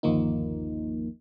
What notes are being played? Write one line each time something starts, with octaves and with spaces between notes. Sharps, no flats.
G1 D#2 F3 A#3 D#4